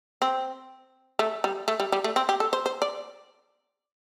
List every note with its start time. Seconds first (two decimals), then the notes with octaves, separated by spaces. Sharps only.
0.22 C4
1.19 A3
1.44 G3
1.68 A3
1.80 G3
1.92 G3
2.04 A3
2.16 C4
2.29 G4
2.40 A4
2.53 C5
2.66 C5
2.82 D5